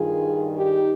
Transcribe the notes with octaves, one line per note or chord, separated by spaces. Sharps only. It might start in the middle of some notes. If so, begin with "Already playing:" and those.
Already playing: G2 D#3 G3 F4 G#4
D#4 G4